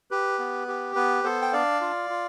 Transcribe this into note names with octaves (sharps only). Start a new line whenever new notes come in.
G4 B4
B3
G4
B3 B4
B3 A4 C5
G5
D4 D5 F5
F4
F4